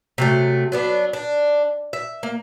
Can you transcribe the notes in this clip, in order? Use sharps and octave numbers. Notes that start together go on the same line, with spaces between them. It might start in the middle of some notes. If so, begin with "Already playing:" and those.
C3 F#3 A3
F#3 B3 D4
D4
E5
A#3